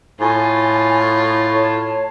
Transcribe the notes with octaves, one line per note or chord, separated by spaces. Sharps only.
A2 F4 G#5
C#5 A5